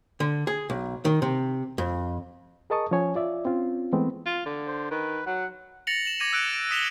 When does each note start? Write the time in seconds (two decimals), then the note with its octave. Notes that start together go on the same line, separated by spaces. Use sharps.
0.20 D3
0.47 G#4
0.70 B1
1.05 D#3
1.22 C3
1.78 F2
2.70 G#4 A#4 D#5 A5 C#6 D#6
2.91 F3 C#4 C#5 G#5
3.15 F4 D5 E5
3.45 C4 C#4 F4
3.93 E3 G#3 A3 B3 C4
4.26 F4
4.46 D3
4.67 C5
4.91 D#3 B4
5.26 F#3 F#5
5.87 A6 A#6 C#7 F7 F#7
6.05 E7 F#7
6.20 D6 G#6 A#6 D#7
6.33 E6 F#6 D7
6.53 D7
6.71 D#6 B6 E7 F7 G7